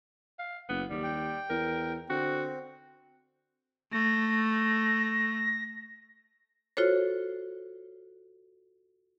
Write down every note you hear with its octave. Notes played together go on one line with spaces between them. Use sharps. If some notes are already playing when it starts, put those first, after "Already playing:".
F5
F#1 B3
D#2 G3
G5
E2 A#4
D3 C4 F#4
A3 A#6
F4 F#4 A4 C5 C#5